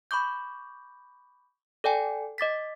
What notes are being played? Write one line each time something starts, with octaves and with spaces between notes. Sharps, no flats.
B5 C#6 D6 G6
A4 D5 G5 G#5
D#5 D6 A6 B6